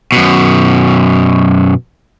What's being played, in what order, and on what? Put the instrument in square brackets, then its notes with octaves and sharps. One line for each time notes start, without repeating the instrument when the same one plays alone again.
[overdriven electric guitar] F#2 B2